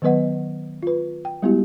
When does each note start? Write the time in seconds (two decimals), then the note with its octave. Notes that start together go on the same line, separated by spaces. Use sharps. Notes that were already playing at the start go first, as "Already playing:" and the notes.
0.02 D#3 F#3 B3 B4 D#5 F#5
0.83 F4 B4
1.25 G5
1.42 G3 G#3 B3 E4 F#4 G4